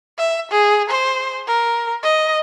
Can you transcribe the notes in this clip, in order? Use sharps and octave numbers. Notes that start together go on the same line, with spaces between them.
E5
G#4
C5
A#4
D#5